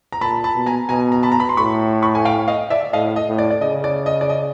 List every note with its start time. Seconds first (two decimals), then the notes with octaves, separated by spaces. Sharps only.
0.12 A#5
0.21 A#2 A5 B5
0.44 A5 B5
0.55 B2
0.66 G#5 A#5
0.89 B2 G#5 A#5
1.12 A#5
1.23 A5 B5
1.32 A#5
1.40 B5
1.49 C6
1.57 A2 B5 C#6
2.02 B5 C#6
2.15 G#5
2.25 F5 G5
2.48 D#5 F5
2.70 D5 E5
2.93 A2 D#5 F5
3.16 D#5
3.27 A2
3.39 D5
3.50 D5
3.61 C#3 D#5
3.84 D5
4.06 D#5
4.21 D5
4.29 D#5